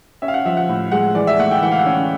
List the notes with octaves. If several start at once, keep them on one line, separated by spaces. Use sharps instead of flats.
C#4 E5
F5
F#5
F3 E5
F#5
A2
G#3 F#5
E3 D5
E5
A3 F#5
G5
E3 F#5
F5
F#5
C#4